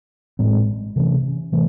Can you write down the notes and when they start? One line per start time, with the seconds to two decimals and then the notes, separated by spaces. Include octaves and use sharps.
0.39 A2 G#3 C4
0.96 C3 E3 A3 C#4
1.52 C3 E3 A3